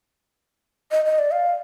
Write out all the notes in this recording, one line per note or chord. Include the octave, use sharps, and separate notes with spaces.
D#5
D#5
D5
F5